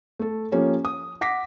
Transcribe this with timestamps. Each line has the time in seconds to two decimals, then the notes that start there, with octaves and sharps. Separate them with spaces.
0.19 A3 A4
0.52 F3 A#3 C#4 G4 A4
0.85 D#6
1.21 F#5 D6 A#6 B6